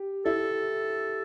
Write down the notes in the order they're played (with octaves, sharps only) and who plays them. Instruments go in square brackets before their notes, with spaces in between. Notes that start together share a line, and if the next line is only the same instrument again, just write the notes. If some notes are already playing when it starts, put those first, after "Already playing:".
Already playing: [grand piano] G4
[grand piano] E4 [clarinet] A4